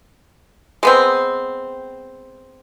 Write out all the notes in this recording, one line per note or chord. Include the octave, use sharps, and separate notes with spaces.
G#3 B3 C4